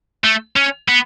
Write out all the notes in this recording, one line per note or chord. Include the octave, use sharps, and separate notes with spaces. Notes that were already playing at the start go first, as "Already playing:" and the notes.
A3
C#4
B3